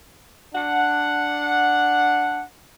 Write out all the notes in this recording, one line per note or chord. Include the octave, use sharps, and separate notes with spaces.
D4 F#5